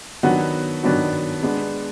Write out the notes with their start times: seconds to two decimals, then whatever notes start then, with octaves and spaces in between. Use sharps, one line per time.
0.23 D#3 F#3 B3 D4 F#4
0.83 D#3 F#3 B3 D4 F#4
1.42 G#3 B3 D4